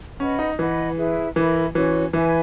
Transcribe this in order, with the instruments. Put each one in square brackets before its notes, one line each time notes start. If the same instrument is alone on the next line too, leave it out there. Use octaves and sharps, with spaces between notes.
[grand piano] C#4 [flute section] B4 D#5 F#5 B5
[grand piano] D#4
[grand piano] E3 [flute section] B4 D#5 F#5 B5
[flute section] E4 G#4 B4 E5
[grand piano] E3 [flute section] A#4 E5 B5
[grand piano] E3 [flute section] C#4 F#4 C#5
[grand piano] E3 [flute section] B4 E5 G#5